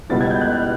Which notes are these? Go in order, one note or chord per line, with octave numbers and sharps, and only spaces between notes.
C#2 B2 G3 B3 E4 A6
G#6
G6
F#6
F6